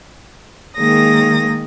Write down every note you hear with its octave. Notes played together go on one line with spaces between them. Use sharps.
D#3 G#3 A#3 G#4 D#6 A#6